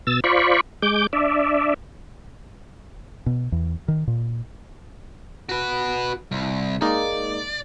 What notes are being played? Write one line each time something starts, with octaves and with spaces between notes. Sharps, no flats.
B2 E6 A6
F4 C5 D5 B5 C#6
G#3 D6 G6
D4 D5 E5
B2
E2
D#3
A#2
F#4 B4
C2
G#3 A#3 D#4 D5